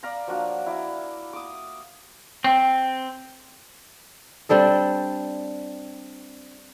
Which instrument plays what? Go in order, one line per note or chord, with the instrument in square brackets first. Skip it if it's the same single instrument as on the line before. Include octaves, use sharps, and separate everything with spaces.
[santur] D5 F5 A#5 B5
F3 F#3 A#3 D4
E4 D5 A#5
D6 D#6
[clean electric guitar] C4
[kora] G3 C4 D4 A4